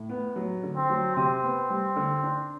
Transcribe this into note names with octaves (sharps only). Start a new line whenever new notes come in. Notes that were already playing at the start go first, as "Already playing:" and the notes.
Already playing: A2
B3
F#3
D3
C4
F#3
C3 C4
B3
G3
D3
D4